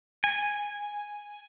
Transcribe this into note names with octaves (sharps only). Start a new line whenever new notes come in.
G#5